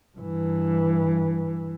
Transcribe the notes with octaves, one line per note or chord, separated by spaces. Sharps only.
G2 E3